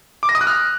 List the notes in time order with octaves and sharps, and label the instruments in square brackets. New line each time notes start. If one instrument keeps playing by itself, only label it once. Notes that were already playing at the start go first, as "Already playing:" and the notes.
[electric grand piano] D6
A#6
D#6
F#6
F6